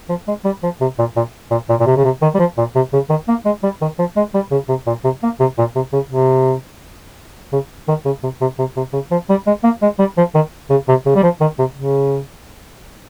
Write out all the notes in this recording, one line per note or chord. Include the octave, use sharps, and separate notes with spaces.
F3
G#3
G3
F3
C3
A#2
A#2
A#2
A#2
A#2
C3
C#3
C3
D#3
G3
F3
A#2
C3
C#3
D#3
A#3
G#3
G3
D#3
F3
G#3
G3
C#3
C3
A#2
C3
A#3
C3
A#2
C3
C#3
C3
C#3
D#3
C#3
C3
C3
C3
C3
C#3
F3
G3
G#3
A#3
G#3
G3
F3
D#3
C#3
C3
C#3
G3
F3
D#3
C3
C#3